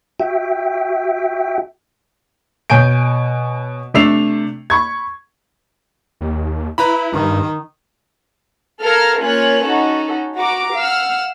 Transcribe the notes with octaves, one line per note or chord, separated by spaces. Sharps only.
F#4 E5 G5
B2 C#5 G#5 G6 D7
C3 A3 D4 E6 C7 F7
B5 C#6 G#6
D#2
E4 B4 A#5 B5
G2 D#3
A4 A#4 F5 A#5 F6 G#6
A#3 C#4 F4 C#5 G#5 F#6
C#4 D#4 F#4 A4
F#4 A#5 D6
F5 F#5 E6 F6